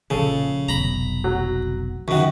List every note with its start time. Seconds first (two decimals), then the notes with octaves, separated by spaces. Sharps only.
0.10 A#1 C#3 F3 G#4 A4
0.69 F1 B1 A#5 B5
1.24 F#3
2.08 F#2 D#3 F#4 C#6